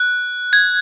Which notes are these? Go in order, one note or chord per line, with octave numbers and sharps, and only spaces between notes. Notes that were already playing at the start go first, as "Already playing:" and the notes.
Already playing: F#6
G#6